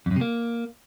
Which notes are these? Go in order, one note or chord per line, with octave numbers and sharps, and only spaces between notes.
F2
F#2
C3
A#3